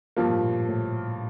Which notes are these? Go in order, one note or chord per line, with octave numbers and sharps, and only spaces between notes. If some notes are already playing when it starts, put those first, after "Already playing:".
G2 F3 A#3
A2
A#2
A2